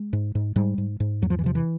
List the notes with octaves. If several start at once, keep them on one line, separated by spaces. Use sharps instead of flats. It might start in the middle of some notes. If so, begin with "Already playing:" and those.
Already playing: G#3
G#2
G#2
G#2 G3
G#2
G#2
E2 F#3
F3
E3
C3 F3
E3